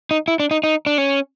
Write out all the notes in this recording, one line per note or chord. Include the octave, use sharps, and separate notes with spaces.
D#4
E4
D4
D#4
D#4
D4
C#4